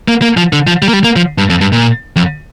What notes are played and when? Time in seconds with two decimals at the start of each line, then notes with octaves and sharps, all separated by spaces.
0.08 A#3
0.22 A#3
0.37 F3
0.53 D3
0.67 F3
0.82 G3
0.89 A#3
0.93 G3
1.04 A#3
1.16 F3
1.38 G2
1.49 F2
1.61 G2
1.72 A#2
2.16 F2